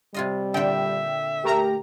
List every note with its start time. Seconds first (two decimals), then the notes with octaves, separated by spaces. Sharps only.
0.14 C3 G3 F4 D#5
0.54 A#2 D3 E5 G5
1.44 A3 G4 A#4 A#5